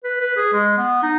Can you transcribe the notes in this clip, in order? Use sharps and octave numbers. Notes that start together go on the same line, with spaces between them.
B4
B4
G#4
G#3
B3
D#4